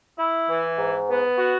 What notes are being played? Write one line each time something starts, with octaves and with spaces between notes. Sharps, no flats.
E4
E3
G#2
B3
F#4